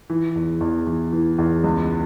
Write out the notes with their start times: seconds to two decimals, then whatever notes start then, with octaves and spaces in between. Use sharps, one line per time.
0.10 E3
0.35 E2
0.61 E2
0.87 E3
1.13 E3
1.38 E2
1.64 C#2